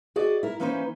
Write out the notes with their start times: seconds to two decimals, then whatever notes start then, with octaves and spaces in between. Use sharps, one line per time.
0.16 F#4 G#4 D5 D#5
0.43 E4 A#4
0.60 E3 A#3 C#4 D#4 B4 C5